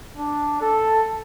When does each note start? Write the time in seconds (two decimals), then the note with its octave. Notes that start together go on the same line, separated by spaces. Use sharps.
0.17 D4
0.61 A4